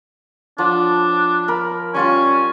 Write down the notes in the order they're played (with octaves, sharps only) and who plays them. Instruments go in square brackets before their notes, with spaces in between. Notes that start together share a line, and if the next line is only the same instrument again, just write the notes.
[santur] F3 C#5 F#5 [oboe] D4
[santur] A#4 B5
[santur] G3 F4 C#5 [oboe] C#4